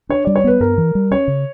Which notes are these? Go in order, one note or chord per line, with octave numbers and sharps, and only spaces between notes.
D4 C#5
G3 D5
C#5
B3 B4
G2 A#4
E3
G3
C#4 C#5
C#3